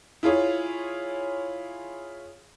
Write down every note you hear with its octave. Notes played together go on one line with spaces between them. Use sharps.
E4 F4 G#4 C#5